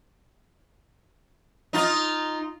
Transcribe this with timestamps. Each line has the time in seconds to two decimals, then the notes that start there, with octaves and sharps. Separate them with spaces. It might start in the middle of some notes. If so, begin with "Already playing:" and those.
1.73 D#4 F4